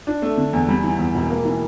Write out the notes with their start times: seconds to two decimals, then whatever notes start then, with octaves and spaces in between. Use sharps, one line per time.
0.07 D4
0.22 A3
0.37 D3
0.53 E2
0.68 G3
0.83 E3
0.99 E2
1.14 E1
1.30 A#3
1.45 E3